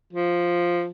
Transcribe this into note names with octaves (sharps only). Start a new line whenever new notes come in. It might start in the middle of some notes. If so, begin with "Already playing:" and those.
F3